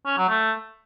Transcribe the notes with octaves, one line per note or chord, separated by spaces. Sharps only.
C#4
F#3
A3